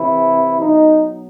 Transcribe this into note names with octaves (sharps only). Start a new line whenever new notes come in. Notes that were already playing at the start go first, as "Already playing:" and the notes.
Already playing: C3 E3 E4
B2 F#3 D#4